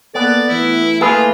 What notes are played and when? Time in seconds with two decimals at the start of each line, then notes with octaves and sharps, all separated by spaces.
0.15 A#3 B3 A4 D5
0.49 E3 A3 E4
1.01 E3 A3 A#3 F4 G#4 B4 A5